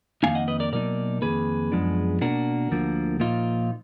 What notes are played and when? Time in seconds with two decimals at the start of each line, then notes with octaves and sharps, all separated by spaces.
0.23 F2 D#3 A#3 D#4 F5 G#5
0.35 D#5 F#5
0.48 B4 D#5
0.60 A#4 D5
0.72 B2 F#3 A#3 D#4 A#4 D5
1.22 F2 D#3 A#3 G#4 B4
1.72 F#2 F3 G#3 B3 D4
2.21 B2 A#3 D4 F#4 A#4
2.71 D2 D3 F3 A#3
3.20 A#2 F3 A#3 D#4 F4